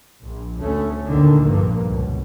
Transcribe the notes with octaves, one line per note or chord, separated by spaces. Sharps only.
A#1
D2 A3 C#4
D2 A#2 D3 D#3
A#1 G2 A#3
C#2 B2